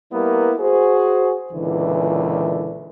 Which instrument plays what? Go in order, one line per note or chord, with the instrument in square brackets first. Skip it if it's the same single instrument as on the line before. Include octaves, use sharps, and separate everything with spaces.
[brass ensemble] G3 A#3 B3 E4 A#4 B4
F#4 G#4 C5
C#2 A#2 D3 E3